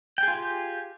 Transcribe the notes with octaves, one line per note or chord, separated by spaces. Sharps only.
F4 G4 G#4 G5